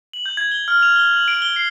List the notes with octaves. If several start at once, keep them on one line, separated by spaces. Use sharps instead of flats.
F#7
G6
G#6
G7
F6
F7
G7
F#7
D7
G7
C7